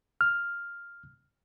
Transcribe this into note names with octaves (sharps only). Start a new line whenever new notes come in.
F6